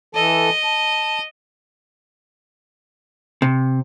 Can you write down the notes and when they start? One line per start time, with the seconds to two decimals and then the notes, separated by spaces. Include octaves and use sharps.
0.15 E3 A4 D#5 A5
0.64 A5
3.42 C3